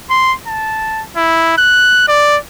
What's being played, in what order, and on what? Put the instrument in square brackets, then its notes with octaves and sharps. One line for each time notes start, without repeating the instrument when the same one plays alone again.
[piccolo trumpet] C6
A5
E4
F#6
D5